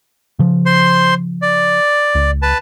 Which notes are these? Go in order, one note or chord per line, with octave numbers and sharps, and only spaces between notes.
C#3 F3
C5 C6
D5
C#2
B4 A5